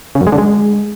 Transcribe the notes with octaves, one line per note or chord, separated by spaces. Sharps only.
C#3
F#2
G#3
D3
G#3